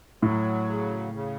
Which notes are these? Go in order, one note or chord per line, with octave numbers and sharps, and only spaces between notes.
A2 F#3
C#3
C#3